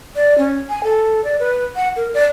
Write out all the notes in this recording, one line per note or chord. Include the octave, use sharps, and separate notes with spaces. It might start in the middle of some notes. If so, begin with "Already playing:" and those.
D5
C#4
G#5
A4
D5
B4
F#5
A#4
D5